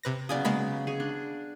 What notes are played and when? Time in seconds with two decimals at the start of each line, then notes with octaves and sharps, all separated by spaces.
0.03 C3 B4 A#6
0.29 C#3 F#3 B3 D5 G#5 D#6
0.45 G#3 A#3 B5
0.87 G#4 C#5
1.00 D4